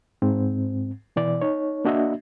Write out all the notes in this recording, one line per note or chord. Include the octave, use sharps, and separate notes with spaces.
G#2 C4
B2 E3 D5
D#4 C#5
A#3 D4 F#4 D#5 E5